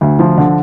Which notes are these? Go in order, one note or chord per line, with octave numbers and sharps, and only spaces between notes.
D2
F3
D3